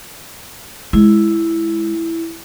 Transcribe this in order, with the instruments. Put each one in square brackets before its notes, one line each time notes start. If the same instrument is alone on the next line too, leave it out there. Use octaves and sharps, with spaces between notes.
[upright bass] G#3 [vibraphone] E4